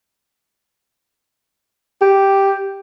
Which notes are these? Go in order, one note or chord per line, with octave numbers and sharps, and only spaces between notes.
G4